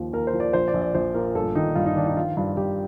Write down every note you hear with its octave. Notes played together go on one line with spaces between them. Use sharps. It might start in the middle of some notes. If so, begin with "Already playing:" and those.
Already playing: D#2 F3
D#2 A#4
C5
F3
D5
A#1 C5
D5
A#1
D5
A#1 C5
A#2 A#4
G1 A4
D#3 D#4
G2 F4
D#4
D#3 D4
D#4
F3 F4
G2 F4
G2 G4